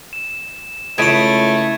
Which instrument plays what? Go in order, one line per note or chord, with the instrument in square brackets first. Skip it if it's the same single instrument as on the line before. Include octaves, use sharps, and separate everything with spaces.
[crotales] E7
[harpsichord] C#2 A5 [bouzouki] C#3 E4 [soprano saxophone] A3 [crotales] G#6 D7 D#7